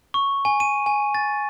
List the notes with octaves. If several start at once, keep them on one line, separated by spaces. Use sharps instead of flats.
C#6
G#5
D#7
G#5
A6